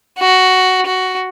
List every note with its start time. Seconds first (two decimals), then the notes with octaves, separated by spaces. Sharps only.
0.19 F#4
0.86 F#4